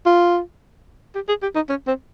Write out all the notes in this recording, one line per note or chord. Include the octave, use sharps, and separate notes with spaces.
F4
G4
G#4
G4
D#4
C#4
C4